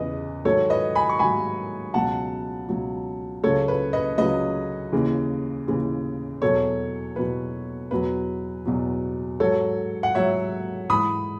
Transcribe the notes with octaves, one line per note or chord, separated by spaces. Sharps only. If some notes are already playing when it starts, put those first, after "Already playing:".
Already playing: E2 C#3 E3 B4 D#5
G#2 D#3 F#3 A4 C#5
B4 D#5
G#5 B5
C#6
G#2 D#3 F#3 G#5 B5
C#2 B2 F#3 F#5 A5
C#2 B2 F#3
C#2 C#3 F#3 A4 C#5
B4
B4 D#5
C#2 C#3 F#3 B4 D#5
D#2 C#3 E3
D#2 C#3 E3
E2 B2 F#3 A4 C#5
E2 B2 F#3 B4
E2 B2 F#3 B4
E2 B2 F#3
G#2 F#3 A4 C#5
F#5
G#2 F#3 C#5 E5
G#2 E3 B5 D#6